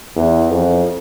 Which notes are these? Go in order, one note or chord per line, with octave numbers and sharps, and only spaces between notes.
E2
F2